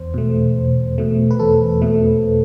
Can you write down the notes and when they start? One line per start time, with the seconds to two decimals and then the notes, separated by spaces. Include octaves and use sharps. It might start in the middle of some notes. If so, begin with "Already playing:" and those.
Already playing: E2 C5
0.14 B2 A3
0.56 E2
0.98 B2 A3
1.31 B4
1.39 E2 A4
1.82 B2 A3